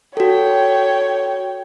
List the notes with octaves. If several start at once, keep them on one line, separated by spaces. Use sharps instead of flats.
F#4 A4 C#5 G5